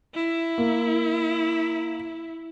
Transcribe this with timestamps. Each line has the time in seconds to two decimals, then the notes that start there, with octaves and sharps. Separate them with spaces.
0.14 E4
0.58 A#3